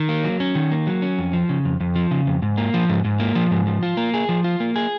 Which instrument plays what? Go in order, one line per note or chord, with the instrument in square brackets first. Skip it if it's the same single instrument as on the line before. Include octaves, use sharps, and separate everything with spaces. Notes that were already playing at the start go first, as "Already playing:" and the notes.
Already playing: [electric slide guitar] D#3
A#3
F#3
C#4
D#3
A#3
F#3
C#4
F2
F3
C#3
F2
F2
F3
C#3
F2
G#2
A#3
F3
G#2
G#2
A#3
F3
G#2
F3
F4
A#3
G#4
F3
F4
A#3
G#4